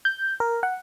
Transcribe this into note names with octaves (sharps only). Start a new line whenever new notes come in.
G6
A#4
F#5